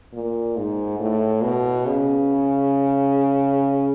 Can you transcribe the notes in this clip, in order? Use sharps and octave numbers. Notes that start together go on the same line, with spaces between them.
A#2
G#2
A2
B2
C#3